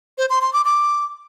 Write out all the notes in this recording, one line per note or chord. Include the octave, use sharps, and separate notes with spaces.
C5
C6
C6
D6
D6